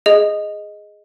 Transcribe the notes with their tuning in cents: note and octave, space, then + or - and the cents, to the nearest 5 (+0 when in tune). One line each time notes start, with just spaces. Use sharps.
G#4 +0 D#5 +0